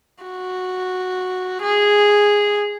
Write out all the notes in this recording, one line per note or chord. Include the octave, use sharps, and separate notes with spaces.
F#4
G#4